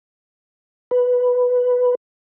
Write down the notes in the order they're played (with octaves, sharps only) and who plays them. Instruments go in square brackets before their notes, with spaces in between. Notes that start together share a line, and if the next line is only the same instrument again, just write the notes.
[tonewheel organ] B4